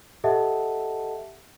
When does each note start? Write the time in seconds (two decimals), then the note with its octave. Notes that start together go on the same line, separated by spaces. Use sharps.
0.24 G4 A4 D#5 E5 F#5 A5